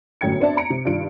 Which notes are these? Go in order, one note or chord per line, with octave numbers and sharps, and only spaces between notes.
G1 F#2 A2 G5 G#6 C#7
B3 C4 D4 D5 E5 A5
A#5 C#7 D7
C3
G2 D#3 F4 D7